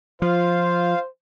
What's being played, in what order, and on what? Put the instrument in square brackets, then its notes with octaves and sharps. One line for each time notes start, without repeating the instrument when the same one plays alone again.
[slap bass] F3 [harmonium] F4 F5 [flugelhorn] C5